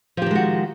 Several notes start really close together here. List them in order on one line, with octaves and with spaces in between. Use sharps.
F3 G4 D#3 G#3 F#4